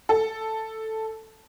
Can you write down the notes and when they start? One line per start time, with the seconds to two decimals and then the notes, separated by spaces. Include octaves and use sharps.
0.09 A4